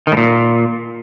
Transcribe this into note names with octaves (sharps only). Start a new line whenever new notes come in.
D#3
A2
A#2